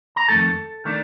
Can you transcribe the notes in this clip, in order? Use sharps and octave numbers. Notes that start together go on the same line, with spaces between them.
A#5
F2 D#3 A3 D4 A4 A5
D#3 A3 D4